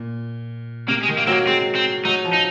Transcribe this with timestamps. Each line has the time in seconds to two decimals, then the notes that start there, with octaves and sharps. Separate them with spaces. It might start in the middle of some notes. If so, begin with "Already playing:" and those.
Already playing: A#2
0.88 C3 A#3
1.03 G#3
1.08 D#3
1.17 A#3
1.27 F#3 C4
1.32 A#3
1.47 G#3 C4
1.75 C4
2.05 F#3 D#4
2.25 F3
2.33 D#4